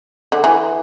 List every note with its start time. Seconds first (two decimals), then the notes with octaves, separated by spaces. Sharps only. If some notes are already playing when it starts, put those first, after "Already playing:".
0.32 D3
0.44 E3